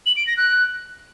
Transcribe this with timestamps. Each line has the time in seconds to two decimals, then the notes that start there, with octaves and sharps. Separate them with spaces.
0.06 F#7
0.16 D7
0.27 A#6
0.37 F#6